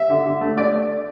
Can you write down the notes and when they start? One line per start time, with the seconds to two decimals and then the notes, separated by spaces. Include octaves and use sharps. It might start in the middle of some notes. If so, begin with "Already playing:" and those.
Already playing: E5
0.10 D3
0.26 D3
0.41 A3
0.57 A3 D5